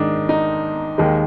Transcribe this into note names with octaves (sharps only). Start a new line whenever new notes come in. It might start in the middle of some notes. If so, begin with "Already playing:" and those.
Already playing: G#2 D#3 G#3 D4 D#4
D#4
D#2 D#3 G#3